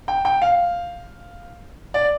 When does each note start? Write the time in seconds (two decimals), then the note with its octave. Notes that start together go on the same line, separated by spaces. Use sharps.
0.08 G5
0.25 G5
0.42 F5
1.94 D5